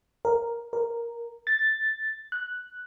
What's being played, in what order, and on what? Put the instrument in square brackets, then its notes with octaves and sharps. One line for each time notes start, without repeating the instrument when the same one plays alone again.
[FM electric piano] A#4
A#4
A6
F#6